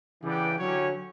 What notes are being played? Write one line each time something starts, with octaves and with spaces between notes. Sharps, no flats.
C#3 E3 B3 D4 G4 D5 G5
D3 F#3 C#4 G4 C#5